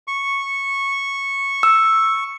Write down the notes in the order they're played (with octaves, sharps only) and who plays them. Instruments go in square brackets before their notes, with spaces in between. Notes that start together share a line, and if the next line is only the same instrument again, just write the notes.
[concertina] C#6
[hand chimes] E6